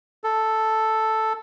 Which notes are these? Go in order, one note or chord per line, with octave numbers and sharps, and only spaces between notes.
A4